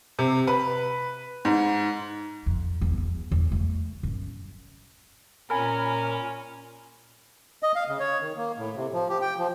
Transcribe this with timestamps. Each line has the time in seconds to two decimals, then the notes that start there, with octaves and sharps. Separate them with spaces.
0.19 C3
0.47 B4
1.45 G#2
2.46 F2
2.81 E2
2.98 E2
3.31 E2
3.52 A3
4.03 F#2
5.50 A#2 C#4 A#4 G#5 B5 F6
7.63 D#5
7.75 F5
7.88 C#3
8.00 C#5
8.21 D#3
8.36 A#3
8.58 A2
8.76 C3
8.94 F3
9.10 G4
9.21 G5
9.38 F3